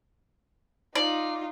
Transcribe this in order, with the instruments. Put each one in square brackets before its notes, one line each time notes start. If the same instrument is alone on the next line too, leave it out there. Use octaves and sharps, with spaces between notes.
[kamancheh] D#4 F4 [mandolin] D5